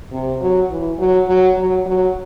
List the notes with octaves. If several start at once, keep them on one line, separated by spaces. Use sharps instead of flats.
C3
F#3
E3
F#3
F#3
F#3
F#3